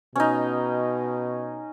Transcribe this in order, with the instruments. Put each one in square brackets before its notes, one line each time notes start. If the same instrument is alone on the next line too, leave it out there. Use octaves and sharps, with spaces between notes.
[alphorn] B2 [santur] C#4 D#4